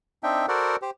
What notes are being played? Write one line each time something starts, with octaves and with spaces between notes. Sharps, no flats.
C4 D4 D#4 E5 G5
F#4 A4 A#4 C5 D5 F#5
G4 C5